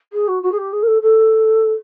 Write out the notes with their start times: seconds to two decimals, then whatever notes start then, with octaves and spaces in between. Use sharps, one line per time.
0.13 G#4
0.28 F#4
0.43 F#4
0.52 G#4
0.58 G4
0.73 G#4
0.83 A#4
0.87 A4
1.02 A4